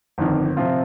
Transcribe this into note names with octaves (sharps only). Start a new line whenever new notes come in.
G1 F2 D#3
C3 F3 C4 F4